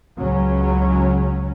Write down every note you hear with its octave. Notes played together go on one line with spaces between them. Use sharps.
C#2 C#3 F#3 C#4